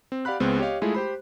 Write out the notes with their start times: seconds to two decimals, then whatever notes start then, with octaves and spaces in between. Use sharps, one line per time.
0.12 C4
0.25 G4 D5 F5 F#5 B5 F#6
0.40 C#2 G#3 B3 C4
0.59 G4 C#5 D#5 F5
0.82 G#3 A3 E4 F4 G#4
0.94 G4 C5 B5